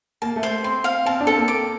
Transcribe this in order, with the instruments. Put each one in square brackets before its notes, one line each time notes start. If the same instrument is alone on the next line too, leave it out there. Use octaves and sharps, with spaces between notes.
[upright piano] A#3 [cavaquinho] A5
[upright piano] A3
[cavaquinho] C5
[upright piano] C4 [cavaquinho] C6
[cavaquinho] F5
[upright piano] C4 [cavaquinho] A5
[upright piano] D4
[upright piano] C4 [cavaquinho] A4
[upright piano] A#3
[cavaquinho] D6